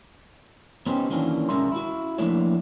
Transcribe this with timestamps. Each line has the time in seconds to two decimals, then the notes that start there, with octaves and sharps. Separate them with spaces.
0.86 B3 C#4 D#4 G4 C5
1.10 D#3 E3 F#3 A#3 C#4 D4
1.49 B1 G#3 C#4 A#4 E5 C6
1.72 E4 F#4
2.18 F3 A3 A#3 D4 E4 C#5